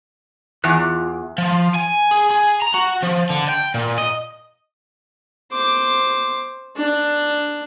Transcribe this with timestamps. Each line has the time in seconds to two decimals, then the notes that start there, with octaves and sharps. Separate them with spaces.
0.64 E2 F4 D6 F#6
1.38 F3
1.75 G#5
2.11 G#4
2.31 G#4
2.62 A#5
2.74 F#4
3.03 F3
3.30 D3
3.49 G5
3.74 A#2
3.98 D#5
5.53 C5 D6
6.76 D4